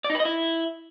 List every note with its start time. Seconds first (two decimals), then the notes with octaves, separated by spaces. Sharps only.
0.04 D5
0.10 D#4
0.15 B4
0.20 D#5
0.25 E4